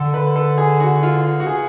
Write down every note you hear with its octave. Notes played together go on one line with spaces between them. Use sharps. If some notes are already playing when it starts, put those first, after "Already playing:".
Already playing: D3 A4
B4
A4
G#4
F#4
F4
F#4
G#4